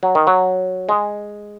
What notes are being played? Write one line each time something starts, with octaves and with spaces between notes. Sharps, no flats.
F#3
D#3
F#3
G#3